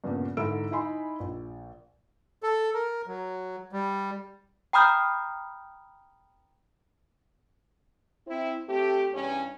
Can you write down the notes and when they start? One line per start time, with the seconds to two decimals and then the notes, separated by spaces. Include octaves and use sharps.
0.04 G2 A#2 C#3 A#3 B3 C#4
0.37 G#2 D3 E4 A4 E6 D7
0.71 D#4 E4 G#5 B5 C6
1.20 A#1
2.43 A4
2.74 A#4
3.07 F#3
3.73 G3
4.73 G5 A#5 B5 D#6 F6 G6
8.26 C4 E4
8.68 A3 C4 G4
9.12 E2 G2 C#4